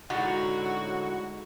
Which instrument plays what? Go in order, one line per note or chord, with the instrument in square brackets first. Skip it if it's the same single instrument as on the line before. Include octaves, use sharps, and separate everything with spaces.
[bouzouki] A2 D3 F#3 [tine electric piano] G#3 D#4 [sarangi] F#4 [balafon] F#5